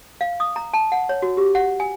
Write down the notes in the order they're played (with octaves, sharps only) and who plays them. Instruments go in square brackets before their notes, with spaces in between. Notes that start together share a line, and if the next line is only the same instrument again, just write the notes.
[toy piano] F5
D#6
A#5
A5
F#5
C#5
F#4
G4
F#5
G#5